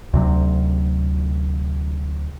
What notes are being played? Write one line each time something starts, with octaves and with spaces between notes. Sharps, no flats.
D2 C3 F#3